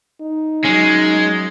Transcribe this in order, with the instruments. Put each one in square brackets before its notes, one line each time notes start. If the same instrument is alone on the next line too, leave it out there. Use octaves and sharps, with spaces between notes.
[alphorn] D#4
[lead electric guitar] F#3 C#4 [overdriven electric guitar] G#3